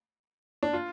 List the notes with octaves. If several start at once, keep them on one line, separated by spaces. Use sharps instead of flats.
D4
F4